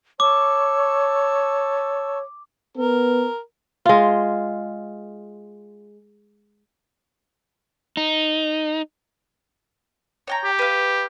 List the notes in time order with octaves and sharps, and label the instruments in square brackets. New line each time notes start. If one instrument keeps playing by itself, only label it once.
[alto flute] C#5 [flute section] A5 C#6 E6 [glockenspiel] D6
[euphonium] B3 [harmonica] A#4
[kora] G#3 F4
[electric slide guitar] D#4
[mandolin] C#5 G5 A#5
[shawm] G4
[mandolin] B4 F5